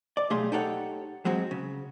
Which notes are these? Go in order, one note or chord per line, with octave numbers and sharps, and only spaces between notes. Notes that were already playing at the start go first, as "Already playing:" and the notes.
D5
B1 G3 A3 G#4 F5 C6
D#4 G4 A4 C#5 F#5
F#3 G#3 C4 F#4
C#3